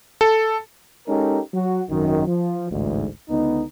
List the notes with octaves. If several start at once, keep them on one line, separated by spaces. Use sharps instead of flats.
A4
G#3 C#4 D#4 G4 A4 A#4
F#3 F#4
G#1 F#2 D#3
F3
A1 D2 G#2
C#2 D3 B3 D#4